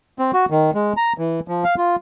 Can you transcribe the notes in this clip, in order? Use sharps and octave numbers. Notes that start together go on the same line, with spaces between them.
C4
F#4
D#3
G#3
A#5
E3
F3
F5
F4